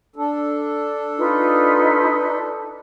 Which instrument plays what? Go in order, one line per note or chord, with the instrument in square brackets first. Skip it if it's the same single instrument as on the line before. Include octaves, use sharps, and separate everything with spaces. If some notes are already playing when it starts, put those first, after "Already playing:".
[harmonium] D4 A4
[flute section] D#4 F4 B4